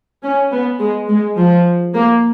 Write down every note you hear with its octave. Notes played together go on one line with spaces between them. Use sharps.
C#4
B3
G#3
G#3
F3
A#3